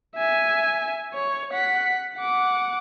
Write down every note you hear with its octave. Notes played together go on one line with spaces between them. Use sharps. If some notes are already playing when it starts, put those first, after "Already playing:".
E5 G#5
C#5
F#5 B6
F#5 D6